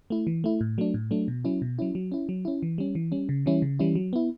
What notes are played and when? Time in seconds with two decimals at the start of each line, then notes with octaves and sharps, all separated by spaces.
0.10 A3 E4
0.27 E3
0.44 A3 E4
0.61 A2
0.78 F#3 A3 D4
0.94 A2
1.11 F#3 A3 D4
1.28 B2
1.45 F#3 C#4 E4
1.62 B2
1.79 F#3 C#4 E4
1.95 F#3
2.12 C#4 E4
2.29 F#3
2.45 C#4 E4
2.63 E3
2.78 G3 C#4
2.95 E3
3.12 G3 C#4
3.29 C#3
3.46 E3 G3 C#4 E4
3.62 C#3
3.79 E3 G3 C#4 E4
3.95 F#3
4.13 B3 E4